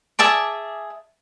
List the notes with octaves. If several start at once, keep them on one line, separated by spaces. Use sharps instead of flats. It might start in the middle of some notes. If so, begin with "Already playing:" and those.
G#4 E5 A5 D6